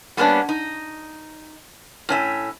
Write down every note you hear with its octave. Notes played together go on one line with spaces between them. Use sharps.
G3 A#3 B3 C#4 D4
D#4
A2 C#4 E5